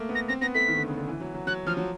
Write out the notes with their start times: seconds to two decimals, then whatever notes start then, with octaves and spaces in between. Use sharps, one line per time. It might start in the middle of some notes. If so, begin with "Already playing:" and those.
Already playing: A3 A#3
0.09 B3
0.15 A#6
0.29 C4 A#6
0.41 B3 A#6
0.55 A3 B6
0.68 D#3
0.78 D3
0.88 C#3
0.98 D3
1.08 E3
1.20 F#3
1.34 F#3
1.47 F#3 F#6
1.66 F3 F6
1.77 F#3